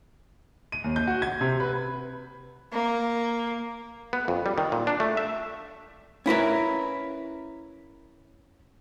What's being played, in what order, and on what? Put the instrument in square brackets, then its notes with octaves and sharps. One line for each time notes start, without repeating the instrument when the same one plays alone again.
[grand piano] D#7
D#2
G6
F#4
G#6
C3
B4
[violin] A#3
[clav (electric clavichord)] B3
F2
G3
D#3
A#2
D4
A3
E5
[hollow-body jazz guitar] C#4 E4 A#4 B4